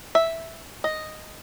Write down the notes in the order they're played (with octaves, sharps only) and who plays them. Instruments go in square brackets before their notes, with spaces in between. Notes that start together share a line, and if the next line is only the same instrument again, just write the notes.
[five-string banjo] E5
D#5